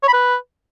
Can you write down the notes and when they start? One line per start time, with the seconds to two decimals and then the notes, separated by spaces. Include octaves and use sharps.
0.03 C#5
0.08 B5
0.13 B4